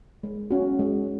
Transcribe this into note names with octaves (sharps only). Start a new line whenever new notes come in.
G#3
C#4 F#4
G#3